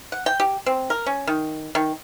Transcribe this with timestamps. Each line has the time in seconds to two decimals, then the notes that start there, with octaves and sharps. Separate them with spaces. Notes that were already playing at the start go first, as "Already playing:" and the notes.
0.12 F#5
0.26 G5
0.40 G4
0.66 C4
0.90 A#4
1.06 C#4
1.27 D#3
1.75 D#3